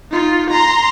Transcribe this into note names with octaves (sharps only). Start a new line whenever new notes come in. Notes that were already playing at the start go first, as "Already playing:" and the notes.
D#4 F4
A#5 C6